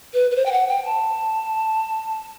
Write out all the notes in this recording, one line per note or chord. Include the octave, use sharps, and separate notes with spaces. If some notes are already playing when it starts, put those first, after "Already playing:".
B4
B4
C5
G5
F#5
G5
A5